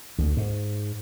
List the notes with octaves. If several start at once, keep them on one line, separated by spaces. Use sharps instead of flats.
D2
G#2